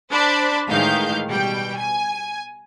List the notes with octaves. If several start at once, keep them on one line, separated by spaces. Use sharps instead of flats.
D4 C5 D5 A5 B5
A2 D#3 E3 G#3 F5 G6
B2 G3 G5
G#5